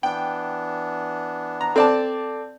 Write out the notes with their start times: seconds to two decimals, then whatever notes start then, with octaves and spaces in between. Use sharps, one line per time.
0.03 E3 B3 D4 G5
1.61 A#5
1.76 C4 A4 D5 A5